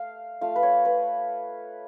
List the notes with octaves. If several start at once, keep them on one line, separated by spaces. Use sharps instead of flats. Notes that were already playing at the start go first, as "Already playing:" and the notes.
Already playing: A3 F5
A3 F4 F5
B4
C#5
B4